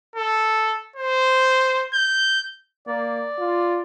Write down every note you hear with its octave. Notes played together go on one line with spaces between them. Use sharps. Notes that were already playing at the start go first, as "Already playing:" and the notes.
A4
C5
G6
A#3 D5
F4